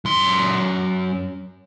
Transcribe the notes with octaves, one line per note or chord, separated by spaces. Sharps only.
F#2 C6